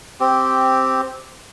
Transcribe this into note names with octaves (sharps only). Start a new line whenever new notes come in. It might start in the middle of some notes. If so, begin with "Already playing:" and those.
C4 G4